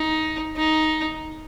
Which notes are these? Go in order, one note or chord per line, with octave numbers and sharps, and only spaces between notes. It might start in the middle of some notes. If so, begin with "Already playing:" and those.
Already playing: D#4
D#4